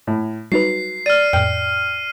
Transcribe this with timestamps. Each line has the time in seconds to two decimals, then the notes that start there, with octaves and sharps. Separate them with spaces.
0.07 A2
0.52 F#3 G3 D#4 B4 C7
1.06 D5 F6 D#7
1.33 F2 A2 G5 F6